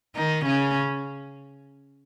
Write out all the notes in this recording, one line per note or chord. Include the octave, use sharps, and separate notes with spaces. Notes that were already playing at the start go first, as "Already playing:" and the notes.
D#3 D#4
C#3 C#4